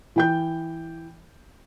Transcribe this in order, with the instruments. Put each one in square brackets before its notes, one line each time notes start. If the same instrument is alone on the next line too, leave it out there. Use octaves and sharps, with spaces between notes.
[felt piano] E3 G5 G6